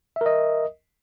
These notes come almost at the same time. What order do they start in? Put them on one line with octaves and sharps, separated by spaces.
E5 A#4 D#5